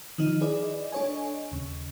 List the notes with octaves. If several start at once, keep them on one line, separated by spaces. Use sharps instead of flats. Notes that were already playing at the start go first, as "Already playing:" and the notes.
D#3 F3 D#4
E4 G#4 B4 D5 D#5
D4 A4 C#5 D#5 G#5
D#2 C#3